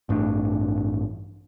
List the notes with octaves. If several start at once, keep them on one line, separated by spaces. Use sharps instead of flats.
A1 G2 A3 D4